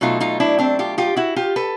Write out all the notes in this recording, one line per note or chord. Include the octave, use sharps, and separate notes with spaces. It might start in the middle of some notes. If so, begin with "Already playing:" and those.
B2 F#3 A3 D#4 F4
D#4 F4
D4 E4
C4 D4
F4 G4
F4 G4
E4 F#4
F4 G4
A4 B4